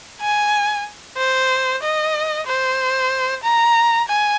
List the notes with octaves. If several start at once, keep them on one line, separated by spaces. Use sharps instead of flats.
G#5
C5
D#5
C5
A#5
G#5